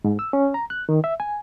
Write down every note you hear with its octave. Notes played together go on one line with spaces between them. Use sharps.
G#2
E6
C#4
A#5
F#6
D#3
E5
G#5